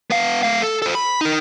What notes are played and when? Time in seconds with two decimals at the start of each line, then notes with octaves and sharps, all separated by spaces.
0.10 B3 F5
0.43 A3 F5
0.62 A4
0.82 A4 C5
0.95 B5
1.21 D#4 A#4